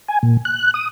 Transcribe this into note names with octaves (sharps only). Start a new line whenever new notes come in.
G#5
A#2
F#6
D#6